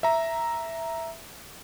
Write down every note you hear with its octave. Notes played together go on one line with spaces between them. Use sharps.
E5 A#5